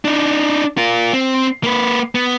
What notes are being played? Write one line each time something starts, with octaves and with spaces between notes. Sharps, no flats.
D4 D#4
F4 A#4
C4
A#3 B4
B3